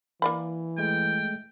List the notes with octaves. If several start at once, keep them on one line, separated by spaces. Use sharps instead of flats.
E3 A#3 D5 B5
G#3 A3 G5